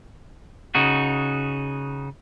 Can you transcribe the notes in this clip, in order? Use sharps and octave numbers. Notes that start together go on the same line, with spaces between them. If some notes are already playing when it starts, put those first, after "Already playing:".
C#3 D#4 F#4